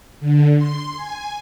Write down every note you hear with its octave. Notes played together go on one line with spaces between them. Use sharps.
D3
C6
G#5